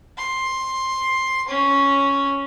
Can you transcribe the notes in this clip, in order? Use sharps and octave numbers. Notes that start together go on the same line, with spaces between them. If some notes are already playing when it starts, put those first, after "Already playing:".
C6
C#4